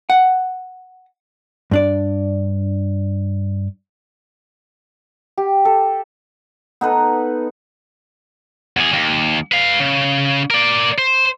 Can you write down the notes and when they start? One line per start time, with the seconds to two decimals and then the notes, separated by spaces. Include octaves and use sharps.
0.10 F#5
1.71 G2 D4 D5
5.38 G4
5.65 A4
6.81 B3 D#4 A4 B4
8.77 E2 G#4
8.93 D#2
9.52 B4 F5
9.80 C#3
10.50 A#4 D5
10.98 C5